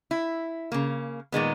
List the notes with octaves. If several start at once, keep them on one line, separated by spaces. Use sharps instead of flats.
E4
C#3 A#3
A#2 D#3 G#3 B3